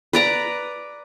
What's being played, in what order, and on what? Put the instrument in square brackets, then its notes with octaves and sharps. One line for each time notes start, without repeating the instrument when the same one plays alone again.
[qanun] B4 D5 A#5